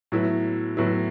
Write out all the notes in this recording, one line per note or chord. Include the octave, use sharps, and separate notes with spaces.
A2 F#3 B3 E4
A2 F#3 B3 E4